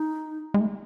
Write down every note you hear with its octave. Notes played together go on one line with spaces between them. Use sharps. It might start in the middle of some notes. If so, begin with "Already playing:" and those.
Already playing: D#4
G#3
A3